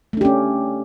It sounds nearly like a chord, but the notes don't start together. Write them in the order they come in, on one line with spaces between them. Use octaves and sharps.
A3 D4 G4 C#4